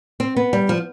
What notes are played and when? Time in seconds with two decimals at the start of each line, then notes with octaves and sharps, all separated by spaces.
0.20 C4
0.36 B3
0.53 G3
0.69 F3